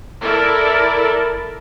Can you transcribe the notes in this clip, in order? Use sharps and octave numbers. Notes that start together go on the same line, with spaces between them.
E4 A4 A#4 D5